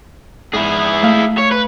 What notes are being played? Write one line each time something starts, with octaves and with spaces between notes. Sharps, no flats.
G#2 E4 G#4
A3 F5
C#5
B4